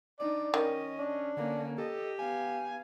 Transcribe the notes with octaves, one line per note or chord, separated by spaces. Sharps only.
D4 D#4 D5
D#3 C#4 D#5
D4
D3 A#3 C#4
G4 A4 D#5
B3 F5 G#5